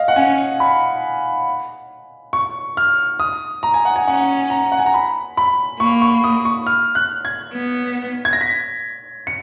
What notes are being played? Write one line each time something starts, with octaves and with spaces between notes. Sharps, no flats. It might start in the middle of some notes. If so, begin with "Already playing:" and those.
Already playing: D#5 F5
F#5
C#4 G#5
B5
C#6
F6
D#6
A#5
G#5
F#5
G#5
C#4 F#5
A#5
F#5
G#5
A#5
B5
B5
A#3 C#6
C#6
D#6
C#6
F6
F#6
G#6
B3
G#6
A#6
B6
C#7